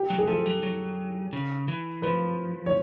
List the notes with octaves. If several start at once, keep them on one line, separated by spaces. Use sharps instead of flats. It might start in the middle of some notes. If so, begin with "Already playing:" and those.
Already playing: G4
F#3
G#4
F3 A4
F#3
F#3
C#3
E3
F3 B4
C#5